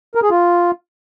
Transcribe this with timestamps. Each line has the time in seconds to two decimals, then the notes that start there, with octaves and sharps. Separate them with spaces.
0.15 A#4
0.23 G#4
0.30 F4